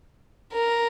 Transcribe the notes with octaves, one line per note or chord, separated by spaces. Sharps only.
A#4